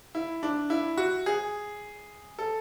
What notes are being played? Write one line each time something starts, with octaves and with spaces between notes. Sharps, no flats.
E4
D4
E4
F#4
G#4
A4